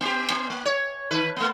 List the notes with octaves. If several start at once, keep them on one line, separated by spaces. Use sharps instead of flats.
B3 G4
B3
A#3
C#5
D#3 B4
A3 B3